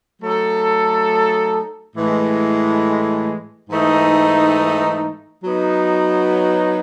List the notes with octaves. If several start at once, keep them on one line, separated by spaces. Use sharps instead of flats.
F#3 A3 D#4 A4
A2 E3 G#3
G#2 E3 A3 D#4
F#3 B3 D#4